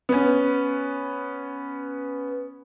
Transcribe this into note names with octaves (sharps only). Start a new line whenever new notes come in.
B3 C#4